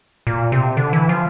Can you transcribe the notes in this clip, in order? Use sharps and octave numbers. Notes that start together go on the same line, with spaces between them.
A#2
C3
D3
E3
F3